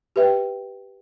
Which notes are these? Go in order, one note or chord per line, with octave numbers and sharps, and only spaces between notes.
G4 B4 E5 G5